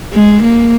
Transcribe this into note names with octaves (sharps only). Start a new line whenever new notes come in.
G#3
A#3